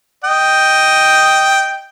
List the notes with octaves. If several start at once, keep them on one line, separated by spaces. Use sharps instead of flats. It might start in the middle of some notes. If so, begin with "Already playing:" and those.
D#5 G5